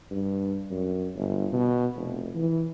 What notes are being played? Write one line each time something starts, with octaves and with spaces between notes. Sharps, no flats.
G2
F#2
G1
B2
F1
E3